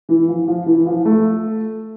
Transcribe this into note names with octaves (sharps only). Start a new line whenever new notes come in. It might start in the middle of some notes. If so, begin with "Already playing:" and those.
E3
F3
F3
E3
F3
A3